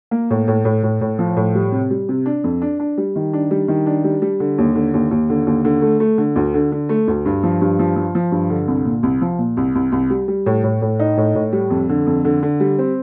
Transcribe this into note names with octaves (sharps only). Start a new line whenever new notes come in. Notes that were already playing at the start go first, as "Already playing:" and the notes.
A#3
A2
A2
A2
A2
A2
F3
A2
G3
C3
G3
C3
D4
F2
D4
D4
G3
D#3
D4
G3
D#3
D4
G3
G3
D3
D#2
D3
D#2
D#2
D3
D#2
D3
A3
A3
D3
D2
D3
D3
A3
D2
G2
F3
G2
F3
F3
F3
G2
D3
C2
A#2
C2
F3
A#2
C2
C2
C2
G3
G3
A2
A2
A2
D#4
A2
A2
G3
F2
D3
F2
D3
D3
G3
C4